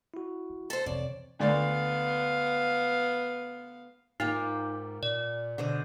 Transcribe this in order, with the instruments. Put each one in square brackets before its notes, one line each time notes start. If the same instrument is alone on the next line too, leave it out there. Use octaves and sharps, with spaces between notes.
[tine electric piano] E4 F#4
[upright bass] E3
[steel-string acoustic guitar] A4 C5
[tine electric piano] F2 C4 C#5 [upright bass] C3 E3 [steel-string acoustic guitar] D5
[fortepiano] D2 D5 [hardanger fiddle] B3 F5
[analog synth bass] G#2 [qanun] A#3 F4 G4 [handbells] D#4
[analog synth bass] A#2 [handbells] D5
[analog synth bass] B2 [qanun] D3 C5 D#5